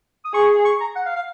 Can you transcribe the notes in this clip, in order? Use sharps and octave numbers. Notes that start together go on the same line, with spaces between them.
D#6
G#4 C#6
C#6
A#5
F#5
F5
F5